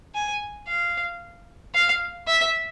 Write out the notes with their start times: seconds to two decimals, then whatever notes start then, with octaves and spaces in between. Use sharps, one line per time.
0.14 G#5
0.68 F5
1.74 F5
2.28 E5